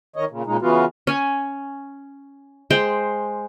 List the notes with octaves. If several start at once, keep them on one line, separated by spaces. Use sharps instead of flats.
D#3 C#5 D#5
A#2 C#3
A#2 C#3 G#3 D#4
C#3 E3 B3 F4 F#4
C#4 G#5
G#3 C5 G5